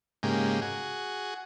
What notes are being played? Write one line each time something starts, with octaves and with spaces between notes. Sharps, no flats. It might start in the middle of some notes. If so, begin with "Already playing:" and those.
G#2 C#3 G#3 A#3 G4
F#4 G#4